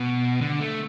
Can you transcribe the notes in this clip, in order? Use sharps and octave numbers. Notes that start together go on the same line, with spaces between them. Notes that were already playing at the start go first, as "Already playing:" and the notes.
Already playing: B2
D3
A3